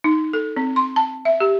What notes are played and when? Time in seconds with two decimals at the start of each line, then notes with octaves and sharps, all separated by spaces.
0.04 D#4
0.33 A4
0.56 C4
0.76 C6
0.96 A5
1.25 E5
1.40 G4